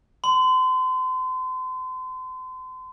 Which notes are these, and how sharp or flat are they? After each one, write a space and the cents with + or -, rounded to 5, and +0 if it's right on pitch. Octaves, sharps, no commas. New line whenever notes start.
C6 -35